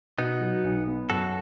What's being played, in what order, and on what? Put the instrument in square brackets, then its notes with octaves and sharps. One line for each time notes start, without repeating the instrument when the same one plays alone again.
[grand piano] B2 [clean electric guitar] B3 D#4
[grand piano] F#3
B1
B3
[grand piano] F#2 [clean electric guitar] F#4 A4